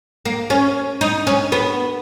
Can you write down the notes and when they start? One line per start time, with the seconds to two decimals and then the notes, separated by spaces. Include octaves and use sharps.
0.25 A#3
0.50 C#4
1.01 D#4
1.27 C#4
1.52 B3